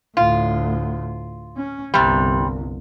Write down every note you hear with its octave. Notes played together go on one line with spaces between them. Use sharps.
D2 A2 F4
C#4
G1 C2 C3 G3